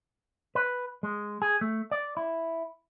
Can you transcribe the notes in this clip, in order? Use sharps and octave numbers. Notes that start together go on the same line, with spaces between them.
B4
G#3
G#4
A3
D5
E4